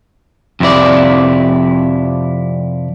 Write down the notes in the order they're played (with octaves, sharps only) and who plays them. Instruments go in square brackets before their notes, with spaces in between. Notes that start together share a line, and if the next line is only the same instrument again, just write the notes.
[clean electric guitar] F2 C3 E4 D5